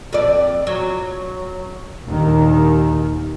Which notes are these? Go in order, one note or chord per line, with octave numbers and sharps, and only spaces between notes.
F2 D5
F#3
A#1 D#2 D#3